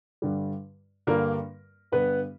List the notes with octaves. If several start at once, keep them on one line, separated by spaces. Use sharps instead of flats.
G2 D3 G3
G2 D3 G3 A#3 A#4
G2 D3 G3 B3 B4